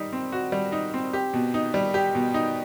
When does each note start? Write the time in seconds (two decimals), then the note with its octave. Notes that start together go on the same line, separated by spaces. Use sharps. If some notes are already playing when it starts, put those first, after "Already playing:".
Already playing: G3 D#4
0.13 C4
0.32 F#4
0.52 G3
0.72 D#4
0.94 C4
1.13 G4
1.33 B2
1.54 D#4
1.74 G3
1.94 G4
2.15 B2
2.34 D#4